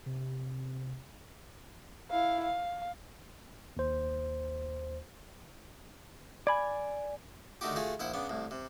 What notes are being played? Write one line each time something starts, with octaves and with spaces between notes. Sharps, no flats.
C3
E4 F5
F5
D#2 C5
D5 G#5 B5 G#6
D3 D#3 A3 D#4 F#4 G4
A3 F4 F#4 G#4
A#1 E4 C5 F#5
C#3 B3 D4
C2 A2
C3